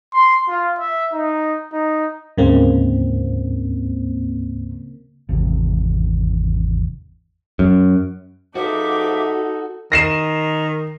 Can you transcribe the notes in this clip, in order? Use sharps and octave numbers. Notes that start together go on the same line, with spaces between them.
C6
F4
E5
D#4
D#4
D2 G#2 C#3 A#3 C4
G#1 E2 C3
F#2
C#2 F3 D#4 F#4 A4 E5 D6
D#3 A#6 C7 E7